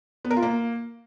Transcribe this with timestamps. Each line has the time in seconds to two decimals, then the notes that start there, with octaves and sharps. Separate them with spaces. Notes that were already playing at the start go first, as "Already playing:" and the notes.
0.25 B3
0.31 A#4
0.37 F4
0.43 A#3